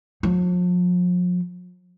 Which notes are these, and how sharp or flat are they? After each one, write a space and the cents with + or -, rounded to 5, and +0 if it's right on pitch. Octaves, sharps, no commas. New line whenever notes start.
F3 +40